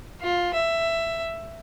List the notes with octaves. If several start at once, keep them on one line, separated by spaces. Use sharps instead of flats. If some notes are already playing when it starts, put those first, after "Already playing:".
F4
E5